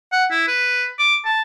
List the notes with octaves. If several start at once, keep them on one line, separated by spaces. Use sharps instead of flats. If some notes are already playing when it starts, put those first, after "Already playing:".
F#5
E4
B4
D6
A5